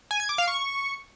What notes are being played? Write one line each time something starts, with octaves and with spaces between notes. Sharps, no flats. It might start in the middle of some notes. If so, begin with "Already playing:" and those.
G#5
G#6
D6
F5
C#6